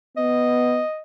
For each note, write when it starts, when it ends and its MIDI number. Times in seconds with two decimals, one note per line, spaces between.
0.17 0.82 59
0.17 1.03 75